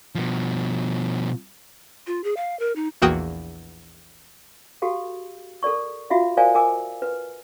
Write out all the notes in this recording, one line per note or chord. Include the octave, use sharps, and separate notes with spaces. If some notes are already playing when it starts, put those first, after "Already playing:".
B2 F3
F4
G#4
F5
A#4
D#4
A#1 E2 A#3 F#4 G5 D#6
F#4 G4 A4 F5
A4 A#4 D5 C#6
F4 F#4 E5 F5
A#4 C5 D5 D#5 F5 G#5
A#4 G#5 D6 E6
B4